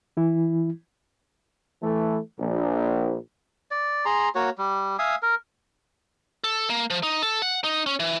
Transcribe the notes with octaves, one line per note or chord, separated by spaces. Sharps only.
E3 E4
E3 A3
A#1
D5
G#4 A#5 C6
A#3 F#4 C#5
G3
E5 F5 G#5 D#6
A#4
A4
A#3
F3
D#4
A4
F#5
D#4
C#4
E3